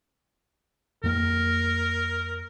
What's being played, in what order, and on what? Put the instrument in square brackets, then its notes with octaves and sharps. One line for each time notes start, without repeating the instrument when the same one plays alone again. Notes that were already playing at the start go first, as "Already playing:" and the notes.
[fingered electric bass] F2 A#3 [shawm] A#4